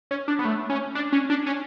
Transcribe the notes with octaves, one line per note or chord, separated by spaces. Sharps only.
C#4
D4
B3
A3
C#4
D4
C#4
D4
C#4